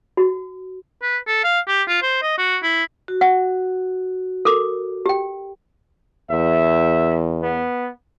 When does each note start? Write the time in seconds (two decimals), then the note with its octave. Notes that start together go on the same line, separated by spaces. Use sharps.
0.17 F#4
1.02 B4
1.28 A4
1.44 F5
1.68 G4
1.88 F4
2.02 C5
2.22 D#5
2.38 F#4
2.63 E4
3.08 F#4
3.21 F#5
4.45 A4 A#4 D6
5.06 G4 G5
6.30 E2 E5
7.43 B3